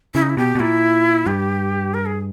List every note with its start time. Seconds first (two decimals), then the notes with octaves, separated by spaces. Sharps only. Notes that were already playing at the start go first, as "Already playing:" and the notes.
0.14 C#3 E4
0.22 D#4
0.29 E4
0.37 B2 G4
0.55 B2
0.60 A#2 E4
1.26 G2 G4
1.94 A#4
2.06 G#4